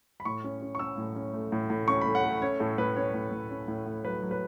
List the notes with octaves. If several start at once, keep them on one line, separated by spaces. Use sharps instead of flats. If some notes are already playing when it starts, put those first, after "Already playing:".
B5
A2 C#6
C#4
C#4
C#6
C#4 E6
A2
C#4
A3
A2
A2
C#4 C#6
A3 B5
F#5
A3
C#4 C#5
A2 A4
A2 B4
C#4 C#5
A2
A2
C#4
A2
A2
F#3 B4
F#3
B4